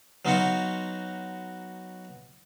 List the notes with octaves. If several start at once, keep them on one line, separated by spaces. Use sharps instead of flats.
F#3 B3 D#4 F4 F#4 F#5